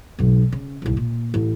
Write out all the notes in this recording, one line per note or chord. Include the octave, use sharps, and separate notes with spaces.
B1 G#2
C#3
D#1 C2
A#2
A1